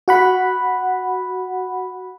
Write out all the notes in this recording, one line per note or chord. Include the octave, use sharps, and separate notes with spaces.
F#4 F#5 B5